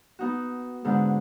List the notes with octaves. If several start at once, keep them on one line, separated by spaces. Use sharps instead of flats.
B3 D#4 F#4
G#2 D3 B3 D4